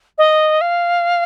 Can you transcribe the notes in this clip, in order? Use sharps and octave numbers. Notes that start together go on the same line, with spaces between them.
D#5
F5